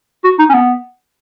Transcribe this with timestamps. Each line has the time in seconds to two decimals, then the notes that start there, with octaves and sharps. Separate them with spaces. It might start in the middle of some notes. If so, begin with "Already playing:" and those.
0.24 F#4
0.39 D#4
0.49 C#4
0.54 B3